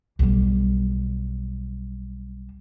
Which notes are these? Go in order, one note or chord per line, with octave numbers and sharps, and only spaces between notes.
B1 G3